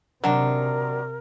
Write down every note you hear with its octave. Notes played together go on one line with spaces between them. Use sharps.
C3 D#3 F#3 D4 A#4